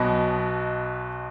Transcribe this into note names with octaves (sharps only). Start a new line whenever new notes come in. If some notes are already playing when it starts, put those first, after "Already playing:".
Already playing: B1 B2 B3 D#5